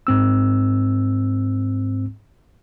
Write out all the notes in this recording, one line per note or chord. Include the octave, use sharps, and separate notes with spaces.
G#2 C4 E6